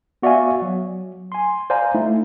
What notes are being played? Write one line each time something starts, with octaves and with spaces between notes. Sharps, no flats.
B3 F#4 D5 E5 F5 G#5
F#3
G#5 C6
C5 D5 F5 G#5 A#5
A3 D#4 E4